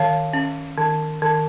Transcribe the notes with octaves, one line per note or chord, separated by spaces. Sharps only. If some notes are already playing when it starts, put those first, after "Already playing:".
Already playing: D#3 C#5 F5
C#4
D#3
D#3